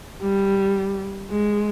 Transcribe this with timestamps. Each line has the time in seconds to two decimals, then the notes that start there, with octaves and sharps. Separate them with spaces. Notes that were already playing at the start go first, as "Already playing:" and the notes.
0.22 G3
1.29 G#3